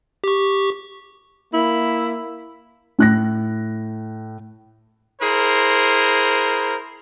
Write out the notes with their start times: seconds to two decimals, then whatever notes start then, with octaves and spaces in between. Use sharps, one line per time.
0.24 G4 C#6
1.54 A#3 E4
2.99 A2 F#6 A#6
5.21 E4 G#4 A#4 C5